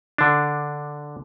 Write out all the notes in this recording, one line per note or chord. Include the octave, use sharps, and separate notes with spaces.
D3 D4